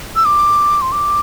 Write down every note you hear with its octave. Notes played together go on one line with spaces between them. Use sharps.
E6
D6
C6
D6